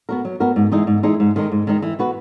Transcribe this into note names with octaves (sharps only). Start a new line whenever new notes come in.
B3 F#4 A#4
F#3
B3 F#4 A#4
G#2
E3 G#3 D#4 G#4
G#2
E3 G#3 D#4 G#4
G#2
D#3 G#3 D#4
G#2
D#3 G#3 D#4
E3
B3 F#4 B4